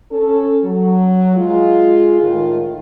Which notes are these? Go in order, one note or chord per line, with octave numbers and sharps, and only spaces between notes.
C#4 A4
F#3
G#3 F4
A2 D#3 F4